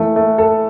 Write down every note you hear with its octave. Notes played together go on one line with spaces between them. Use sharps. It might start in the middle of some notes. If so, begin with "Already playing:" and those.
Already playing: E3 A3
A3
A4